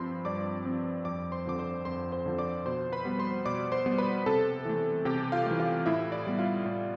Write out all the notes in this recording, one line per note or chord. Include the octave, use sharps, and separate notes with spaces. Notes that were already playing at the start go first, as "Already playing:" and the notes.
Already playing: G2 F3 C4 C5 B5 C6
G2 D5 D6
F3 C4
F2 D5 D6
C5 C6
D3 F3 C4 D6
C5 C6
F2 C5 C6
C5 C6
D3 F3 C4
D5 D6
B2 C5 C6
B4 B5
G3 B3
C5 C6
B2 D5 D6
C5 C6
G3 B3
B4 B5
C3 A4 A5
E3 A3
C3 G4 G5
F4 F5
E3 A3
F4 F5
A2 E4 E5
D5
G3 B3
F4 F5
A2